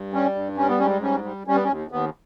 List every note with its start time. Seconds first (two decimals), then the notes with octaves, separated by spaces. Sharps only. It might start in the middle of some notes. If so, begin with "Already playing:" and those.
Already playing: G2
0.13 G3 C#4
0.35 G2
0.57 G3 C#4
0.69 B3
0.79 G#2 C#4
1.02 G3 C#4
1.24 G3
1.47 G3 C#4
1.55 B3
1.64 C#4
1.69 D#2
1.91 D#2 B3